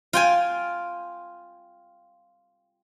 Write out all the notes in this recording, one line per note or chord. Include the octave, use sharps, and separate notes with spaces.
F4 G5 G#5